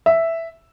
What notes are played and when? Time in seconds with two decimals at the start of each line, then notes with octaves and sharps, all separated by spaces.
0.06 E5